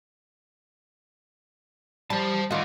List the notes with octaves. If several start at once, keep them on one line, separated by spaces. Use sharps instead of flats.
G3 C5 A5
D#3 F4 F#4 D5